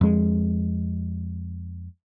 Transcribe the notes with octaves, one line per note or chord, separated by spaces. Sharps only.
F2 G#3